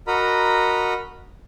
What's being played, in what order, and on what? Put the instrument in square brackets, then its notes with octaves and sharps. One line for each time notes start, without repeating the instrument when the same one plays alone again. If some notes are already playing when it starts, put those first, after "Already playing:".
[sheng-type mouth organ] F#4 A#4 D#5 A#5 B5